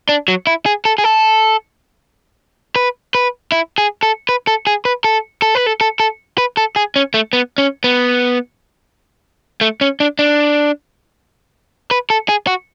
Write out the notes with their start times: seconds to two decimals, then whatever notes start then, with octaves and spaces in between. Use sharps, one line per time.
0.09 D4
0.28 F#3
0.47 E4
0.66 G#4
0.85 A4
0.98 G#4
1.04 A4
2.76 B4
3.15 B4
3.52 E4
3.78 G#4
4.03 A4
4.29 B4
4.47 A4
4.67 G#4
4.85 B4
5.04 A4
5.42 A4
5.55 B4
5.66 A4
5.81 A4
6.00 A4
6.38 B4
6.57 A4
6.76 G#4
6.96 C#4
7.14 A3
7.33 B3
7.58 C#4
7.84 B3
9.61 A3
9.81 C#4
10.00 D4
10.19 D4
11.91 B4
12.10 A4
12.29 G#4
12.47 F#4